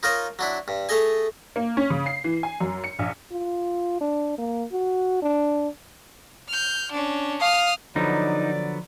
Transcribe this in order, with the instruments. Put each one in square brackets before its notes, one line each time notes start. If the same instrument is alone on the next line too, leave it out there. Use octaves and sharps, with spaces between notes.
[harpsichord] D#4 F4 A#4 C#5 D#5
F#3 D4 E4
G2
A3 G#4 A4 D#5 G#5
[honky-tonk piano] A#3
C#4
C#3
C7
E3
G#5
F#2
C#7
A#1
[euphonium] F4
D4
A#3
F#4
D4
[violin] F6 G6
C#4 D4
[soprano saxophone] F5 [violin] D#6 F6
[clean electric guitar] D3 F#3 B3 [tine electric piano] F3 [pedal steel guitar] D#4 [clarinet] D5